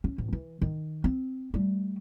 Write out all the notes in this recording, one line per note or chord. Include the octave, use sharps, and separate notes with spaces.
C#4
A1
E3
D#3
C4
G3 A3